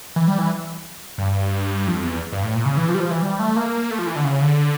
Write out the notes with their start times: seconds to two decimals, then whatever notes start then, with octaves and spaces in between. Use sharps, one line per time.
0.16 E3
0.28 G3
0.39 E3
1.18 G2
1.87 F2
2.03 E2
2.32 G2
2.43 A2
2.55 A#2
2.65 C#3
2.77 E3
2.88 F3
2.94 G3
3.00 F3
3.11 E3
3.22 G3
3.39 A3
3.56 A#3
3.91 A3
3.99 F3
4.07 E3
4.16 D3
4.24 C#3
4.41 D3